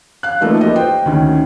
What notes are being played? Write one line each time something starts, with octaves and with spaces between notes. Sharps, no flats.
F5 F#6
E3 F3 A3 A#3 D#4 E4
F4 G4 B4 D#5
C5 G5
D2 D#3 C#4